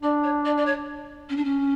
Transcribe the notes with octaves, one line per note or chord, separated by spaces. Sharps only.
D4 D5
C#5
D5
D5
C#5
C#4
D4
C#4